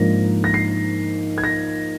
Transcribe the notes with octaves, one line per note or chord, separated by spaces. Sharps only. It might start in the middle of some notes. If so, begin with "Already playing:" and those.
Already playing: G#2 F3 A#3 D4 A#6
A#6
C7
G#6
A#6